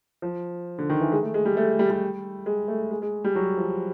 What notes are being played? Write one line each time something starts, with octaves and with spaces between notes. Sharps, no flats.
F3
D3
D#3
E3
G#3
A3
G#3
G3
A3
G3
G3
G#3
A3
G#3
G#3
G3
F#3
F3